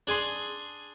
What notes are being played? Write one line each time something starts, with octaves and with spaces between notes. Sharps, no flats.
D4 G#4 G#5 C6